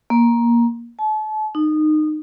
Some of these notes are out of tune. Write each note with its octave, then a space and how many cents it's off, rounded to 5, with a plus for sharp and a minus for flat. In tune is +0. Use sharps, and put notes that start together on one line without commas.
A#3 +15
A5 -35
D#4 -20